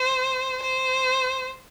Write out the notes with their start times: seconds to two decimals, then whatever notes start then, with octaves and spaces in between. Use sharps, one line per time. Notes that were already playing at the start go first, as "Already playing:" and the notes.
Already playing: C5
0.62 C5